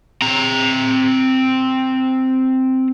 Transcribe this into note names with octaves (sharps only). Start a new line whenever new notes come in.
C4 A#5